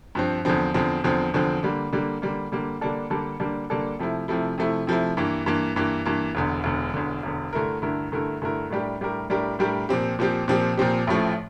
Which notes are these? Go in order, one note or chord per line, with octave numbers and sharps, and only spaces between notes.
G2 F3 C4
E2 D3 F3 C4
E2 D3 F3 C4
E2 D3 F3 C4
E2 D3 F3 C4
D3 G3 A#3
D3 G3 A#3
D3 G3 A#3
D3 G3 A#3
D3 G3 A#3 D4 A4
D3 G3 A#3 D4 A4
D3 G3 A#3 D4 A4
D3 G3 A#3 D4 A4
C3 F3 A3 E4
C3 F3 A3 E4
C3 F3 A3 E4
C3 F3 A3 E4
G2 E3 A#3
G2 E3 A#3
G2 E3 A#3
G2 E3 A#3
E1 E2 D3
E1 E2 D3
E1 E2 D3
E1 E2 D3
G2 D3 A3 E4 A#4
G2 D3 A3 E4 A#4
G2 D3 A3 E4 A#4
G2 D3 A3 E4 A#4
A2 G3 D4 G4 A#4
A2 G3 D4 G4 A#4
A2 G3 D4 G4 A#4
A2 G3 D4 G4 A#4
A#2 F3 C4 G4
A#2 F3 C4 G4
A#2 F3 C4 G4
A#2 F3 C4 G4
A1 A2 F3 A3